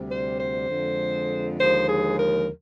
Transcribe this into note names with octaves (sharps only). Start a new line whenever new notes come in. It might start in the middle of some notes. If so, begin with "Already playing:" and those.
Already playing: D2 C3 G3
C5
C5
F2 D3 G#3
D#2 D3 F3 G#3 C5
G#4
A#4